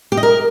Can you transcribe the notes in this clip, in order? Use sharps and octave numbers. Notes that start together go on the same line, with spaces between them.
G4
D#5
A#4